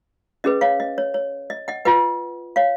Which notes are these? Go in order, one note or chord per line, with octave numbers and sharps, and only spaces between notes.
C#4 G#4 B4 D#5
C#5 F5
D#5
C#5
C#5
D#5
D#5 F#5
F4 B4 D#5 F#5
C#5 F5